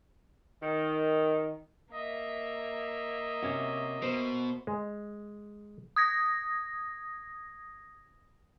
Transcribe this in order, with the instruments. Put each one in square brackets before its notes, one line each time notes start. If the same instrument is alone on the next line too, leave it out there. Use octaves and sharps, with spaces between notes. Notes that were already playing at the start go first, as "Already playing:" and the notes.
[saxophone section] D#3
[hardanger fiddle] A#3 E5 [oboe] D#5
[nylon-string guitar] C3 C#4 F#4
[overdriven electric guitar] B2 [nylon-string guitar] C5
[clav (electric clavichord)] G#3
[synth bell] D#6 G#6 A#6